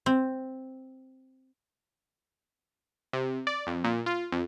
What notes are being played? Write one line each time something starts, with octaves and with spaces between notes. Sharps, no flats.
C4
C3
D5
F2
A#2
F4
F2